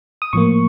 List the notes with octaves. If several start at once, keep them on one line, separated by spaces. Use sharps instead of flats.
D#6
A2 F3 A#3 C#6